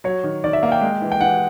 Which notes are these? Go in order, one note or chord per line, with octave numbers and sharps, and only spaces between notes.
F#3 C#5
D#3
D#3 D5
E5
A#3 F5
G5
G#3
E3
G5
E3 F#5